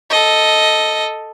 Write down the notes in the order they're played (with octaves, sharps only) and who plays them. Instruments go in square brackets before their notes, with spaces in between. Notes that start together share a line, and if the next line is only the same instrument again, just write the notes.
[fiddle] A4 D#5